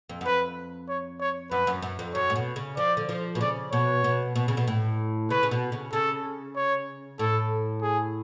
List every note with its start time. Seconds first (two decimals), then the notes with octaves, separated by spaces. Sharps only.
0.09 F2
0.21 F#2
0.26 F2 B4
0.89 C#5
1.20 C#5
1.51 F#2 B4
1.67 F#2
1.82 F#2
1.99 F2
2.14 F#2 C#5
2.30 A2
2.36 B2
2.56 C#3
2.77 F3 D5
2.97 D3
3.09 F3
3.35 B2
3.41 C#3 D5
3.72 B2 C#5
4.04 B2
4.35 B2
4.48 C#3
4.57 B2
4.68 A2
5.30 C#3 B4
5.43 C#3
5.51 B2
5.72 C#3
5.93 C#3 A4
6.56 C#5
7.19 A2 A4
7.82 G#4